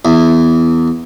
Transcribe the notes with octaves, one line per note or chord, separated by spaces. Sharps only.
E2